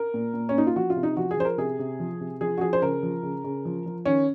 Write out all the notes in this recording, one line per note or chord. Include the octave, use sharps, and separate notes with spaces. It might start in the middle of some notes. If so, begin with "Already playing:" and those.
Already playing: A#4
A#2
A#2
C#4
A#2 D#4
F4
F3 F#4
F4
C3
D#4
F3 F#4
G#4
F3 C5
A#4
C3 G#4
C3
F3
C3
F3 G#4
F#4
F3 G#4
C5
C#3 A#4
F3
C#3
C#3
F3
F3
D#3 C#4